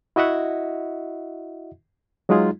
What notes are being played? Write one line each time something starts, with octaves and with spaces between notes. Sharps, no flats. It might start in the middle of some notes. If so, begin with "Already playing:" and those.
E4 F#4 D#5 E5 F#5
F#3 G#3 D#4 F4 G#4